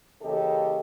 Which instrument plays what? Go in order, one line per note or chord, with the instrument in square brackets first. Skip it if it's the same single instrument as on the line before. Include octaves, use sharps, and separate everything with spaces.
[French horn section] C#3 E3 A#3 G4 A4 D#5